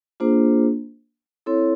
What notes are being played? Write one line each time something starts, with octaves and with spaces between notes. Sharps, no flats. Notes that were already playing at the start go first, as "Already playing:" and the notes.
A#3 D4 F4 G#4 C5
C4 E4 A4 C#5